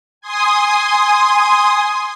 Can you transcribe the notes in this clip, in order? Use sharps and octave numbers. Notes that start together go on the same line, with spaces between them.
G#5 C6 D#6